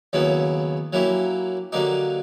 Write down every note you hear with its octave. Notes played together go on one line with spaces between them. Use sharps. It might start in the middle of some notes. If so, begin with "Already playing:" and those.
D#2 C#3 F#3 B3 E4
F#3 A#3 C#4 E4 G4
D3 F#3 A#3 D#4 G4